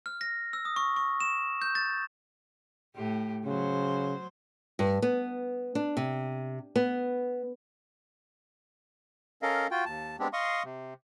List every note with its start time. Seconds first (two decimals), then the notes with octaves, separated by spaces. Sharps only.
0.06 F6
0.21 A#6
0.53 E6
0.65 D#6
0.76 C#6
0.96 C#6
1.20 E7
1.62 G6
1.75 A6
2.96 A2 G4
3.45 C#3 F#3 C5
4.79 G2
5.02 B3
5.75 D4
5.97 C3
6.76 B3
9.42 C#4 A4 A#4 D#5 F5
9.71 F4 F#4 G5
9.86 D#2 A5
10.19 G#3 B3 C4 D4 G4
10.33 D#5 F5 C6 C#6 D#6
10.64 C3